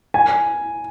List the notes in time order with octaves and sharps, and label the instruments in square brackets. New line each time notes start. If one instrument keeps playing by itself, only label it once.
[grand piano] G#5